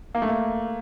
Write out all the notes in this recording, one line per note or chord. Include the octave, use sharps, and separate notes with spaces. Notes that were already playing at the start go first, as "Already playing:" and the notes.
A#3
A3
A#3